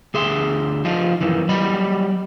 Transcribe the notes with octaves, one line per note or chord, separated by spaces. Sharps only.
D2 G#4 E5 C6
F3 D#4 F4
F#2 D#3 E3
F#3 G3 D#5 B5